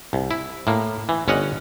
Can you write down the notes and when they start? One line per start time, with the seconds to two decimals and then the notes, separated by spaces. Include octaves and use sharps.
0.13 C2
0.31 E4
0.67 A2 A#3
1.09 E3
1.28 G1 C#4 C#5 D#5 F#5